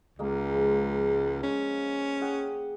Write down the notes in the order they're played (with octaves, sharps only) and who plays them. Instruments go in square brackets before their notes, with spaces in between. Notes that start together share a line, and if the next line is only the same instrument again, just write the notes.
[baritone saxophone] C#2 [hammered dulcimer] G#3 A#3
[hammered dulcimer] F3 C5
[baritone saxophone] C#4
[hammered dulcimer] G#4 F#5 G5